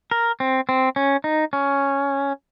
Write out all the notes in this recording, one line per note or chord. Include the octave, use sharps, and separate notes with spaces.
A#4
C4
C4
C#4
D#4
C#4